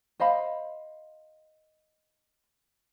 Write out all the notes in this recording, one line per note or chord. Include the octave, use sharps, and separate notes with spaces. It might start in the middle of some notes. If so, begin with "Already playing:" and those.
C5 D#5 F5 B5